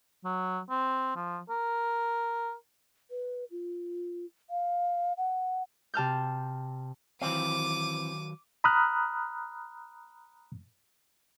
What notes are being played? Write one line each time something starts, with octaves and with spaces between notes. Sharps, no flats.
F#3
C4
F3
A#4
B4
F4
F5
F#5
C3 A5 F6 G6
D#3 E3 F#3 C4 F5 D6 D#7
A#5 B5 D#6 F6 F#6